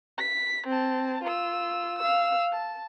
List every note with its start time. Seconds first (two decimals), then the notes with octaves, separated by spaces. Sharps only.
0.18 B6
0.67 C4 A5
1.23 F4 E6
1.98 F5 E6
2.52 A5